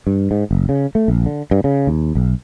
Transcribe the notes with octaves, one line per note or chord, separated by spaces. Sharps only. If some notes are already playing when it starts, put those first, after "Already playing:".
G2
G#2
F#1
C#3
A3
A#1
D3
G2
C#3
D#2
B1